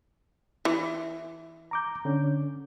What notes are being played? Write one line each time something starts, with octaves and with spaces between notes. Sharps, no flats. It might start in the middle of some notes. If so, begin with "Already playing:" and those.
E3
A#5 D6 G6
D3 C#4